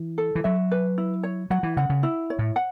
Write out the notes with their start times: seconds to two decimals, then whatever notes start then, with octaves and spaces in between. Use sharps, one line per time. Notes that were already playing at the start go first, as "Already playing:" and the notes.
Already playing: E3
0.18 A4
0.35 E3
0.44 F#3 E5
0.72 B4
0.98 E4
1.23 C#5
1.50 F#3 F#5
1.63 E3
1.77 C#3 F#5
1.90 C#3
2.03 E4
2.30 C#5
2.39 A2
2.56 F#5